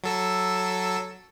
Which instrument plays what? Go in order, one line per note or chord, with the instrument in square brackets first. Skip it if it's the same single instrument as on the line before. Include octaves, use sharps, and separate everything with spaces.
[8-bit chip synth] F#3 A4 E6